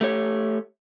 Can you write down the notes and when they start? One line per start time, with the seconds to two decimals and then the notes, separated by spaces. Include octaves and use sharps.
0.01 A3 G4 C#5